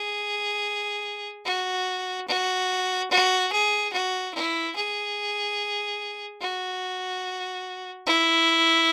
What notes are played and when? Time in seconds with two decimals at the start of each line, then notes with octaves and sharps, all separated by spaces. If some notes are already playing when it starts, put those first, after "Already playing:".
Already playing: G#4
1.45 F#4
2.27 F#4
3.10 F#4
3.52 G#4
3.93 F#4
4.34 E4
4.76 G#4
6.41 F#4
8.06 E4